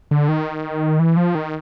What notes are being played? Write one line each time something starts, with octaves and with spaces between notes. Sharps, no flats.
D3
D#3
E3
F3
D#3